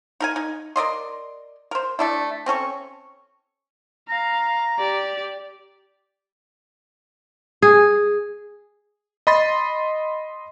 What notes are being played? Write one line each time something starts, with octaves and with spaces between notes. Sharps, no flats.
D#4 A#4 G#5
D#4
A#4 D5 D#5 C6
A#4 C5
A3 D4 E4
C4 C#4 A4 C#6
F5 A#5
G4 D5
G#4
D#5 B5 C6 A6